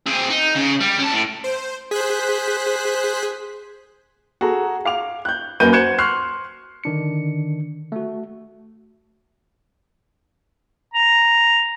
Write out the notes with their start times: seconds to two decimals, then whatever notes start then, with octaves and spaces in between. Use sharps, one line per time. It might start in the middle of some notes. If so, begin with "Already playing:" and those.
0.06 C4 G#4
0.29 D#4
0.55 C#3
0.80 G3
0.98 C#4 A5
1.12 A2
1.44 C5
1.91 G#4 C5 F#6 B6
4.41 F#4 G#4 A4 A#5
4.85 F5 D6 F7
5.25 F#6 G6
5.60 F#2 A#3 F#4 B4 G6 D#7
5.72 F#4 C5 F#6 G#6 C#7 E7
5.98 C6 C#6 F6 F#6 C7
6.84 D3 D#3 D4 C#7
7.92 A3 F#4
10.94 A#5